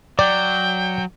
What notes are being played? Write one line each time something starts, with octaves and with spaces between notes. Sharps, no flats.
F#3 D5 G5